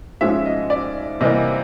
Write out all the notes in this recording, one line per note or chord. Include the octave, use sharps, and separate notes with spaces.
G#2 F3 G#3 C#4 E5
D#5
D5
C3 E3 G3 A#3 D#5